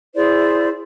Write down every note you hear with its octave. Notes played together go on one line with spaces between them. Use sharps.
E4 G#4 C5 D5